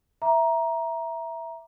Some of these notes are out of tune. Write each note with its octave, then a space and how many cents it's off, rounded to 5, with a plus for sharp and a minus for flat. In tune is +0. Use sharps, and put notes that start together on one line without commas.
E5 +0 A#5 +15 D6 +0